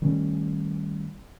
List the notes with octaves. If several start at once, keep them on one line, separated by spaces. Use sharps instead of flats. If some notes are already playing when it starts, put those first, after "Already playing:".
D#3 G3 A3 C#4